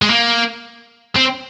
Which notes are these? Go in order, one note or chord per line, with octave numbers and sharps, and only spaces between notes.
G#3
A#3
C4